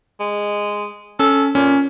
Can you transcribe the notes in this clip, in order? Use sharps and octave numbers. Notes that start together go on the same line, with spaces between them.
G#3
C#4 A4
A#2 C#4